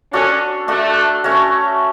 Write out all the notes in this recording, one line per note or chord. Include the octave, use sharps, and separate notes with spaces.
C#4 D4 F#4 A4
A3 D4 F#4 A4
A3 C#4 F#4 C#5